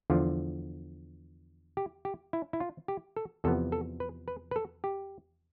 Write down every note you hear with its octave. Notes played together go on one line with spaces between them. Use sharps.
E2 D3 F3 F4
G4
G4
E4
E4
F4
G4
A4
E2 C3 F3 B3 A4
A4
B4
B4
B4
A4
G4